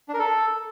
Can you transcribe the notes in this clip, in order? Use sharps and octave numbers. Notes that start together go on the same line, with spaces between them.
D4
A#4
A4